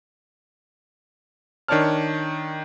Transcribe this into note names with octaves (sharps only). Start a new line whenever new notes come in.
D#3 D4 C#5 D5 A5 F6